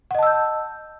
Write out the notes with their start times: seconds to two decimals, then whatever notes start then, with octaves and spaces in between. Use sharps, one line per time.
0.11 F#5
0.15 D#5
0.19 A5
0.23 E6
0.27 G6